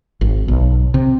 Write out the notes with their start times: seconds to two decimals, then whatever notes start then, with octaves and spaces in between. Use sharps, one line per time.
0.21 G#1
0.48 B1
0.94 C3